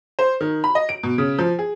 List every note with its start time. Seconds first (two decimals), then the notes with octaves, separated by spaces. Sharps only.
0.19 C5
0.41 D#3
0.64 B5
0.75 D#5
0.89 D7
1.03 B2
1.18 C#3
1.39 F3
1.59 G#4